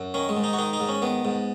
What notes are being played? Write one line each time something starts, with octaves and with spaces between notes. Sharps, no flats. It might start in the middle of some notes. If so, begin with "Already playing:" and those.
Already playing: F#2
D#3 C#4
G#3
G#2
D#4
F#4
D#3 D#4
D#4
G#2
C#4
D#3 B3
G#2